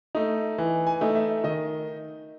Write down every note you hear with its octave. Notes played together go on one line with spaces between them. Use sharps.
A3 D#4
E3
G#5
A3 D#4
E5
D#3 D#5